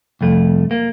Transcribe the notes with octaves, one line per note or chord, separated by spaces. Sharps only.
C2 F2 A3
A#3